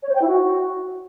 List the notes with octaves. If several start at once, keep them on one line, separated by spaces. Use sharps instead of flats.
C#5
C5
G5
E4
F#4